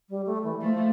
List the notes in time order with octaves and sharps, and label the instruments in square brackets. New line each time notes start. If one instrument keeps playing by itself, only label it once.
[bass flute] G3
A3
E3
[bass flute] F3 [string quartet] A3